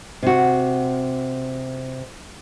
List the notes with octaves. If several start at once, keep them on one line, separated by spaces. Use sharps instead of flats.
C3 F#4